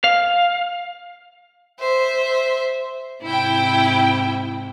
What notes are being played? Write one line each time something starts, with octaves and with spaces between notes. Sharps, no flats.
F5
C5 E5
G#2 C3 C4 E4 G5